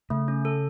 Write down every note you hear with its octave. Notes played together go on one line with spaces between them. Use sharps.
C#3 A3
C#4
A4